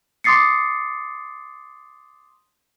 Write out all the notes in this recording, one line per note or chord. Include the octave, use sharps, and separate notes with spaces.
C6 D6 D#6 A6 C7 C#7